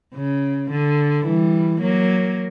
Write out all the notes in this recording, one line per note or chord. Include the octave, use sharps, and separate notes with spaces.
C#3
D3
E3 G3
F#3 A#3